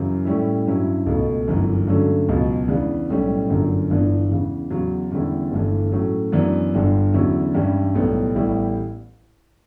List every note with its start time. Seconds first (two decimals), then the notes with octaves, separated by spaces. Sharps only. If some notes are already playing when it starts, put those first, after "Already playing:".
Already playing: F#2 C#3 E3
0.25 A2 G3 C#4 E4
0.67 G2 F#3 C#4 E4
1.06 C#2 B2 A3
1.48 G1 F#2 E3
1.87 G2 D3 F#3 A3 C#4
2.28 C#2 B2 F#3
2.68 E2 C#3 E3 B3 D4
3.10 B1 A2 G3 C#4
3.49 G1 F#2 D3
3.90 G1 G2 E3 B3 D4
4.31 E2 C#3 E3
4.71 E2 C#3 F#3
5.12 E2 D3 G3 C#4 E4
5.52 G1 G2 E3 A3
5.92 A2 F#3 C#4
6.32 F#2 E3 B3 D4
6.74 G1 G2 D3 G3
7.14 E2 D3 F#3 C#4 E4
7.54 G2 E3 G3 C#4 E4
7.95 B1 A2 G3 B3
8.35 A1 A2 G3 B3 E4